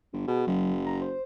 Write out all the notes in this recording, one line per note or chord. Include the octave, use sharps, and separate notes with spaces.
G1
B2 G#4
F#1 F#3
A#5
C5